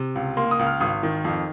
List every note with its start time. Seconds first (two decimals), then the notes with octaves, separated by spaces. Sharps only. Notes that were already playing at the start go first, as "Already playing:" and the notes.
Already playing: C3
0.15 C#2
0.37 A#3 C6
0.51 D#6
0.59 C#2
0.67 F6
0.80 G#1 D#6
1.03 D#3
1.25 F2